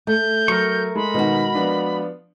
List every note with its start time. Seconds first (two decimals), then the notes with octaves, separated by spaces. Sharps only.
0.07 A3 G6
0.48 F#3 A#4 C#6
0.95 G#3 B5
1.14 B2 D#3 G#3 F#4
1.54 F3 B3 D4